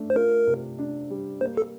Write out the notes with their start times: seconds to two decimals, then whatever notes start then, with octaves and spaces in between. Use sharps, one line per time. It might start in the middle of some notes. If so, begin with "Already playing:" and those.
Already playing: A3 D4
0.10 C5
0.16 F4 A#4
0.47 C3
0.78 D4
1.10 G3
1.41 A#3 C5
1.57 A4